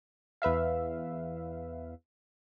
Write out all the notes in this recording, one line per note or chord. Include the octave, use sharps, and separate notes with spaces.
E2 B4 E5 F5